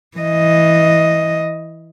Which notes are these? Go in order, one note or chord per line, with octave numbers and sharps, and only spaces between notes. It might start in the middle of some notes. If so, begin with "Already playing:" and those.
E3 D#5